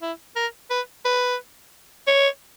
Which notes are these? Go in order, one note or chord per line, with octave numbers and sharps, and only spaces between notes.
E4
A#4
B4
B4
C#5